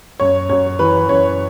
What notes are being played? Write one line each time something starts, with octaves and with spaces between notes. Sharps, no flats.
F#2 C#5
F#2 C#5
E3 B4
F#2 C#5